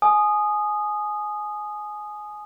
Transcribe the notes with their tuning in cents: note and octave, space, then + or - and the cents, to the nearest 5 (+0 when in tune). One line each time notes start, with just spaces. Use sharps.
G#5 +20 D#6 -10